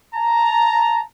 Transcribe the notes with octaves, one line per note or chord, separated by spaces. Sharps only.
A5 A#5